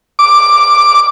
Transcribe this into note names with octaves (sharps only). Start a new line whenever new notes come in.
D6